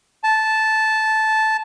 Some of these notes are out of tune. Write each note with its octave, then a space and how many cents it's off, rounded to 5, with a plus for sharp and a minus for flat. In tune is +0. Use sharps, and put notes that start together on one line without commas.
A5 -10